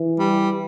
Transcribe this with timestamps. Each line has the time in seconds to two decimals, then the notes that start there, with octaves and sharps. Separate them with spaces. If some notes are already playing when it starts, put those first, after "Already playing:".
Already playing: E3
0.19 G3